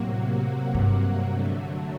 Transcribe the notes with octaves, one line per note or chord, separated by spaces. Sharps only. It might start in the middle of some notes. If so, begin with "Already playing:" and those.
Already playing: A2 C3 F#3 A#3 F#4
A2
G2
D3 F#3 A3